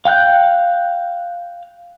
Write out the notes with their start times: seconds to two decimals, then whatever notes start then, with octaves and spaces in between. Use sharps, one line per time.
0.05 F5 G5 F#6 G6